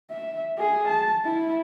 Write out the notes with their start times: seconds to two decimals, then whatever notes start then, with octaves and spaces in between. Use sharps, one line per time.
0.11 E5
0.58 G#4
0.88 A5
1.25 E4